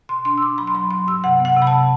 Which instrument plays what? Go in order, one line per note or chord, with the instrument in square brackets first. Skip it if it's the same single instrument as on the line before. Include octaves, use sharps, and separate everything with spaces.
[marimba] B2 C6
D4 C6
E6
D4 D6
F#3 B5
C6
F#3 B5
F#3 C6
G2 E6
C3 F#5
B3
F#5
C3
B5
A5
C3